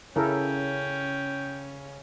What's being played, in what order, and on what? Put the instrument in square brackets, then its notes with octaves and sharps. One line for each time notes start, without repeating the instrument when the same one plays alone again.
[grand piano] C#3 [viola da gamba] C#4 [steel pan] E4 A4 A#4 [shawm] G5